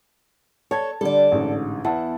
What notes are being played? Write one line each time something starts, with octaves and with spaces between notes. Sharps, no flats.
A4 C#5 A5 G#6
D3 G3 A4 D5
A1 G#2 D3
E2 E4 F#5 A5